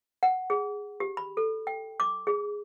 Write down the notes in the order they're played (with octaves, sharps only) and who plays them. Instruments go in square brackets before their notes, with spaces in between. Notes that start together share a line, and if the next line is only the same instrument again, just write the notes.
[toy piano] F#5
G#4
G4
B5
A4
G5
D6
G#4